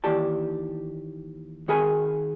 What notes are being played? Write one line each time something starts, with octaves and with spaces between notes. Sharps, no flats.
D#2 D#3 E3 G4 D5 A5
D#3 F#4 G#4 A#4 G#5 B5